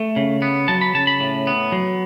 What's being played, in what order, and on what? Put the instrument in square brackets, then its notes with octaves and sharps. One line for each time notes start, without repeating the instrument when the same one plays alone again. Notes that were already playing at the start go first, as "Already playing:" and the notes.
Already playing: [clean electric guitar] A3
C#3
B3
F#3 A5
B5
C#3 A5
B5
A2
B3
F#3